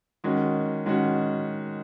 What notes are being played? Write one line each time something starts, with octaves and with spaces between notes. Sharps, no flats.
D#3 G#3 C#4 F#4
D#3 G#3 C#4 F#4